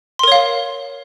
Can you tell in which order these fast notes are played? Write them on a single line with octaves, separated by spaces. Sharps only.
C6 A#4 C#5 F5